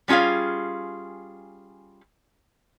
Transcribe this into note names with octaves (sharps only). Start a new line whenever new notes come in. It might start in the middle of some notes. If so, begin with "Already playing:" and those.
G3 C#4 F4 G#4 F5